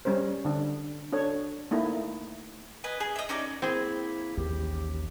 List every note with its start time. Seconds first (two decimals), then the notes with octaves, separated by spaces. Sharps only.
0.05 G3 C#4 A#4 C5
0.45 D3 D4
1.12 D4 A4 C#5
1.71 A3 A#3 D#4 E4
2.84 B4 D#5 G#5
3.00 G#4
3.16 D#5 E5
3.29 C#4 D#4 G4 D5
3.62 A#3 C4 E4 G#4
4.37 A1 D#2 G4